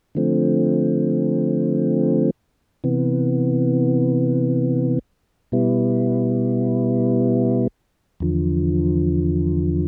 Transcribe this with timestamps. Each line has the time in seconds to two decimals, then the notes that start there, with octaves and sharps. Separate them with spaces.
0.15 D3 F3 A3 C4
2.84 C3 E3 B3
5.52 B2 G3 B3 E4
8.20 E2 D3 F3